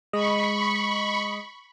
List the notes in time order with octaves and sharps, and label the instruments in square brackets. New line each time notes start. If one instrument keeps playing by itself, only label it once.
[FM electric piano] G#3 D#5 D#6 [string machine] B5 C#6